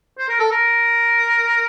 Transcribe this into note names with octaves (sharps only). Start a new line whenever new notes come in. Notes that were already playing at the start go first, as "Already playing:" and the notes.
C5
A#4
A4
A#4